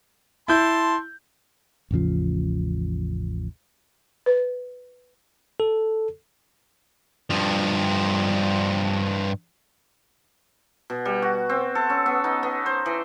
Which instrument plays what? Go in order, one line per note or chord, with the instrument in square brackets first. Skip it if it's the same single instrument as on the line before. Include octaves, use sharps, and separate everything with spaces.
[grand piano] E4 G6 [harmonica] A5 C6
[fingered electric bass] A1 E2 C#3 F3
[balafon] B4
[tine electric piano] A4
[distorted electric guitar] G2 F3
[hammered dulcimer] B2
G3
F#4
C4
A4
C#4
B3
D#4
B3
C5
E3